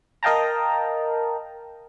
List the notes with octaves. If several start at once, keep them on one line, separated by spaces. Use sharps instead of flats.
A#4 D#5 F5 G5 A5 A#5